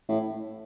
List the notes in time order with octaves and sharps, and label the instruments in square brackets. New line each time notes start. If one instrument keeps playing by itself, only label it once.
[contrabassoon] A2